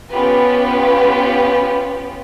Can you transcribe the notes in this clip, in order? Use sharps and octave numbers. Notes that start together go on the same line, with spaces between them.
B3 C#4 F4 G4 B4